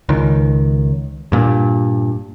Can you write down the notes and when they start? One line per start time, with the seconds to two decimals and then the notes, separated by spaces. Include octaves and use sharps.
0.09 C#2 D#3
1.32 G2 A#2